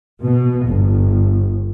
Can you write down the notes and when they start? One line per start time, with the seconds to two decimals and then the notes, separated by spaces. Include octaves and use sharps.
0.24 B2
0.67 G1